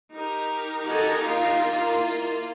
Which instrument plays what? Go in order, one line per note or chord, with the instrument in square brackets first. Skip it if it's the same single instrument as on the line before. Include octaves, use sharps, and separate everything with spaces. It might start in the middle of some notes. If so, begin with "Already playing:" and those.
[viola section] D#4 G4 A#4
[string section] F#4 A4 [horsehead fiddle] D#5 G#5
[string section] A#3 F4 [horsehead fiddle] F5
[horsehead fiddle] E4